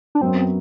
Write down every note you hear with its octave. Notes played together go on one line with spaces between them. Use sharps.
D4
F#2 F#3 B3 C4